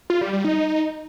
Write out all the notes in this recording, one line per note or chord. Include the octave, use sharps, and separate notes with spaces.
F4
G3
G3
D#4